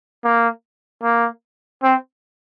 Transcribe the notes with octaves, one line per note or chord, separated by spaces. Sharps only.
A#3
A#3
C4